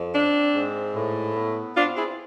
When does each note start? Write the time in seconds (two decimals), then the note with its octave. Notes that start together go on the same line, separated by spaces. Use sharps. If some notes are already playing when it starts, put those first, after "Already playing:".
Already playing: F2
0.14 C4 D4
0.55 G#2
0.96 A2
1.36 B3
1.77 C4 D4 F4
1.97 E4 G#4